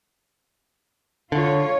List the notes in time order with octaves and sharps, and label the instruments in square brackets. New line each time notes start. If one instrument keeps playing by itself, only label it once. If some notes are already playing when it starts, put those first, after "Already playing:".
[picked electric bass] D3 [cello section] F4 C#5